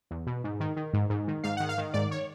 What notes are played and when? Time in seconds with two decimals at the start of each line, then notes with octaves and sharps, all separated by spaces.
0.11 E2
0.27 B2
0.44 G#2
0.60 D#3
0.76 D#3
0.93 G#2
1.10 G#2
1.28 D#3
1.43 G#2 F5
1.57 D#3 F#5
1.69 F5
1.78 D#3
1.93 G#2 D5
2.11 C#5